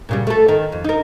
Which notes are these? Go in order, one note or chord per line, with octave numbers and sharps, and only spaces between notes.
A#2 C#3 G3
A3 A4
D#3
F2
D#4 A#4